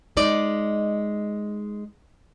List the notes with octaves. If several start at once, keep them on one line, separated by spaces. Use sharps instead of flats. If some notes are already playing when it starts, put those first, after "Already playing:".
G#3 D#4 D5